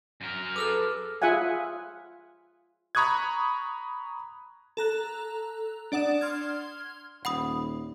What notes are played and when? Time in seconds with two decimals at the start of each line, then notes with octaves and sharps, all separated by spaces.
0.21 F#2 A#4
0.56 G#4 A4 B4 D6 E6 F6
1.22 F4 G#4 E5 F#5 G#5
2.95 A#5 B5 C#6 D#6 F#6 G#6
4.77 A4 A#5 F#6
5.92 D4 D5 F#5 D#6 E7
6.21 C6 F6 G#6
7.25 D#1 F#5 B5 D#6